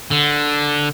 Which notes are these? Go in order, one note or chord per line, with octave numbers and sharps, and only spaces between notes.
D3